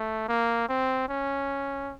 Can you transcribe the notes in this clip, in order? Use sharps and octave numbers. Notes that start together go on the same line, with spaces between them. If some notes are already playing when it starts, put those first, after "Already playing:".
Already playing: A3
A#3
C4
C#4